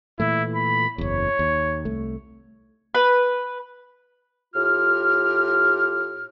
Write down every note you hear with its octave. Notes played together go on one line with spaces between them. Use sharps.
A#2 E3 A3 E4
B5
F#1 E2 C#5
D#2
C2 A3
B4
A2 F4 G4 F6